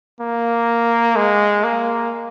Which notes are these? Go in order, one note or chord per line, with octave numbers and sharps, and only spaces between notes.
A#3
G#3
A#3